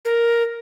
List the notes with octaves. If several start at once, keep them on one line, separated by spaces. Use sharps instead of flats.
A#4